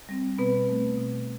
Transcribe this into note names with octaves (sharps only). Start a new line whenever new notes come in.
G3 C4
B2 B3 B4
A3 C4
B2